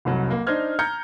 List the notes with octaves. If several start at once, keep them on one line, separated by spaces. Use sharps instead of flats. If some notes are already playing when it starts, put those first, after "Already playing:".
F1 C2 F#3
A#3
D4 D#4 C5 F6 G#6
A#5 F6 G6 G#6 C#7